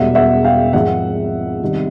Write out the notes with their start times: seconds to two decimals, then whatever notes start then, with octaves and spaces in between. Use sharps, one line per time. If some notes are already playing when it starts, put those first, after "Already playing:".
Already playing: E1 E2 B2 G3 E5 F#5
0.15 E5 F#5
0.44 F5 G5
0.73 G#1 G#2 F3 G#3 E5 F#5
1.61 E2 C3 D#3 G3